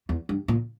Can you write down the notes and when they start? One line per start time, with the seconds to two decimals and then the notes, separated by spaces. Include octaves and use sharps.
0.09 E2
0.29 G2
0.48 A#2